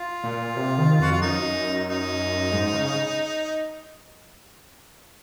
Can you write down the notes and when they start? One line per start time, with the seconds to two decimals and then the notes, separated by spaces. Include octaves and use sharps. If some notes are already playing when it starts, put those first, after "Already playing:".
Already playing: F4
0.24 A#2
0.56 C3
0.78 D#3
1.00 F2 F#4
1.11 F4
1.22 F#2 D#4
1.87 D#4
2.52 G#2
2.73 C#3